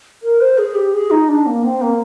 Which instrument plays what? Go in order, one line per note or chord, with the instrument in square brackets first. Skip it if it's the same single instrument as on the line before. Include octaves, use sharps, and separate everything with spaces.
[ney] A#4
C5
G#4
G4
G#4
D#4
D4
A#3
C4
A#3